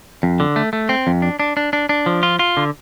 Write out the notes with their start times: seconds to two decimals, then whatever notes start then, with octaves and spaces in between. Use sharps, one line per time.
0.23 F2
0.40 D3
0.56 A3
0.73 A3
0.89 C4
1.07 F2
1.22 D4
1.40 D4
1.57 D4
1.73 D4
1.89 D4
2.06 F3
2.23 F4
2.39 F4
2.57 D3